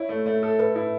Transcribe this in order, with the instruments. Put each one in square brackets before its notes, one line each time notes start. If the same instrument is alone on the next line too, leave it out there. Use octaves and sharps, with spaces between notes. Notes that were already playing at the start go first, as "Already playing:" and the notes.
Already playing: [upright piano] E4 [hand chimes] C#5
[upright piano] A3
A3
A4
[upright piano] A4 [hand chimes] B4
[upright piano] E4